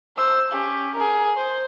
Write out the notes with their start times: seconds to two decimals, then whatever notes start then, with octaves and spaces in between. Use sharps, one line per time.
0.17 C5 E6
0.51 C#4 G4
0.94 G#4 A#4
1.36 C5